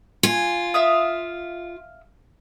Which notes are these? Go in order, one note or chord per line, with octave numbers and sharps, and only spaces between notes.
F4 G#5
E5 F5 D#6